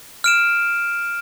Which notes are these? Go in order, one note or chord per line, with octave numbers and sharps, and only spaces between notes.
F6 D7 E7